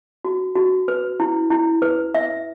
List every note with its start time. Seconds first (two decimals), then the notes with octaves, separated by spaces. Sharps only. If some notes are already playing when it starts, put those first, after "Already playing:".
0.25 F#4
0.55 F#4
0.88 B4
1.20 E4
1.50 E4
1.82 B4
2.14 E5